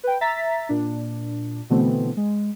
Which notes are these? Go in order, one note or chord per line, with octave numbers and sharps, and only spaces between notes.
B4 G5
E5 A#5 A6 B6
A#2 D4
B2 D3 E3 A3 B3 C4
G#3